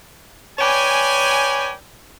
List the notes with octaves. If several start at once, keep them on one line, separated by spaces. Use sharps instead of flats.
B4 C#5 D5 G5 G#5